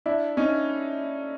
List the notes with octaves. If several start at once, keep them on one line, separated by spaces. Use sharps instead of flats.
D4 E4
C#4 D#4